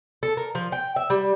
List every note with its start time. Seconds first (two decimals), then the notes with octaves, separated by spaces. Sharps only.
0.23 A4
0.37 A#4
0.55 F3
0.72 G5
0.96 E5
1.10 G3